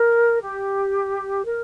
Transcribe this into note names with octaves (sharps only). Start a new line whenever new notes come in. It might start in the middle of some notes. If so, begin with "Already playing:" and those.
Already playing: A#4
G4
A#4